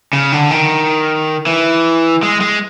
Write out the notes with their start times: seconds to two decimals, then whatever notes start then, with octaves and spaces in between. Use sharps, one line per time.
0.13 C#3
0.32 D3
0.51 D#3
1.47 E3
2.23 G#3
2.41 G#3